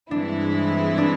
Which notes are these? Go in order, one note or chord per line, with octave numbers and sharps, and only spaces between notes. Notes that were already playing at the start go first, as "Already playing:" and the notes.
G2 E3 G#3 C4 D4 E4
D4